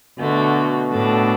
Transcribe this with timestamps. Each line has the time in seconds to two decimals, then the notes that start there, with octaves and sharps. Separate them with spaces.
0.18 B2 D3 A3 F#4
0.91 A2 A3 D4 A4